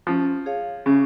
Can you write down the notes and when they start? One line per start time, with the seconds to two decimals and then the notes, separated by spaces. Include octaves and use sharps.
0.07 F3 C#4
0.46 G#4 C#5 F5
0.86 C#3 C#4